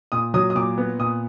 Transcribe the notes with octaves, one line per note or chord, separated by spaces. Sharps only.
A#2 D#6
F#3 D#6
D#6
A#2 D6
B3
A#2 D#6